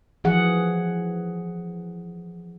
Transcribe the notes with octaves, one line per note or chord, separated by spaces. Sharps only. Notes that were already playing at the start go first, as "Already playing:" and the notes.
E3 F3 G#4 F#5